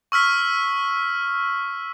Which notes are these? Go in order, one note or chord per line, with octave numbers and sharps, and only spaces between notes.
C#6 E6 F6 B6